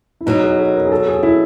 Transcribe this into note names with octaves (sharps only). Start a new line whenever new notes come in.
E4
B2 F#3 B3 D#4
G#4
A4
A#4
G#4
A4
G#4
E4